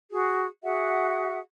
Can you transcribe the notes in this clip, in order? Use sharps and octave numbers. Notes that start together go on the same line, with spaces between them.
F#4 G#4
F#4 G#4 E5 F#5